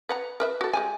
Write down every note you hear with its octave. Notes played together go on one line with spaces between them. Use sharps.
B4 F#5 A#5
A#4 B4 E5
F#4 A4
G#3 G4 G#5